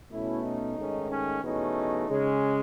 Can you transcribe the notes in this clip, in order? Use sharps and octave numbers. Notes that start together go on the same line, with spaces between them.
B2 A3 C#4 E4
D#4
G#2 D#3 A3 C#4
C#4
E2 B2 A3 C#4 D#4
C#3 G#3 C#4